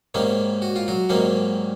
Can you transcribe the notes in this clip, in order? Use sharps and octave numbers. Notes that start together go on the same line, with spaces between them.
G#2 D#3 G3 A#3 C#4
F#4
F4
F#3 F#4
G#2 D#3 G3 A#3 C#4